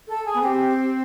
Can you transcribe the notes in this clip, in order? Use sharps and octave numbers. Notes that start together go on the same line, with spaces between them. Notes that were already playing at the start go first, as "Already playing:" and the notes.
A4
G#4
B3
C4 G4